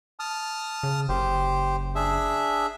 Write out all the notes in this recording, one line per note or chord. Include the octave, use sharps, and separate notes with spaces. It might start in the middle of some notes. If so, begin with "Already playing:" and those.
A5 D#6 F6
C#3
F#1 G4 C5
D4 G#4 E5